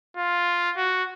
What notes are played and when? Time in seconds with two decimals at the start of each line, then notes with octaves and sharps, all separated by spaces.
0.17 F4
0.77 F#4